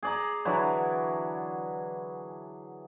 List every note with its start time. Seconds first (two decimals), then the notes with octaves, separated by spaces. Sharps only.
0.03 G#4 D5 A#5
0.45 D3 E3 F#3 E4